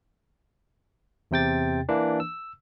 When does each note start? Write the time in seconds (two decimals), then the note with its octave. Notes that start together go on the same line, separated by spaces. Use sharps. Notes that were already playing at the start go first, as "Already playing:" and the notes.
1.31 E2 C3 G5 A6
1.89 E3 A#3 D4
2.20 E6